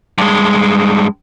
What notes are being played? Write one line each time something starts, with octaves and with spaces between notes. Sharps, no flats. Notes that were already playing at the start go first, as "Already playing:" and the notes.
G2 G#3